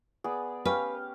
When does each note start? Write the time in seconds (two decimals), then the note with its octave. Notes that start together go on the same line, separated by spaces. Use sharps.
0.24 B3 G#4 D5
0.65 C#4 G4 B4 F5